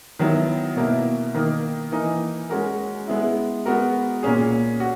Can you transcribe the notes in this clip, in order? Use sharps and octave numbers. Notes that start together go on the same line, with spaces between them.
D#3 F#3 B3 E4
B2 A#3 E4
D#3 A#3 D#4
E3 A#3 D#4
G#3 C#4 F#4 A#4
G#3 B3 E4
G#3 B3 F#4 A#4
A#2 A#3 C#4 G#4
F#4